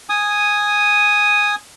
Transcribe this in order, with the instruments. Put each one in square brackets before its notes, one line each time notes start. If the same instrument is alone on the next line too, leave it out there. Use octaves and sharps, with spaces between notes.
[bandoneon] G#5 D#6